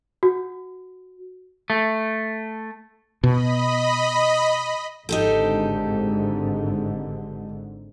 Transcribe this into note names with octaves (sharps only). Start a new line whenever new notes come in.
F#4
A3
B2 D#5 B5
G#1 G#2 D3 D#4 G4 A4